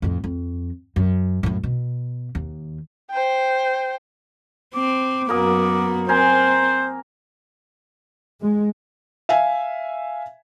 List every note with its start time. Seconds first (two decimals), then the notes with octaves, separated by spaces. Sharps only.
0.02 F2 A2
0.24 F2
0.96 F#2
1.43 F#2 A2
1.63 B2
2.35 D#2
3.10 C5 G5
4.75 C4 D6
5.29 F#2 A#3 B3 F#4 A#4 D#6
6.09 C4 A#4 C5 G#5
8.41 G#3
9.29 E5 F5 G#5